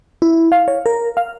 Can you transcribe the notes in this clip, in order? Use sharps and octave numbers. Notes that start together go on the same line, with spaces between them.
E4
F5
C#5
A#4
F5